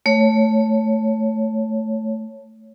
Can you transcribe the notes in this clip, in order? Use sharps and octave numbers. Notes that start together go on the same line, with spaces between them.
A3 C#5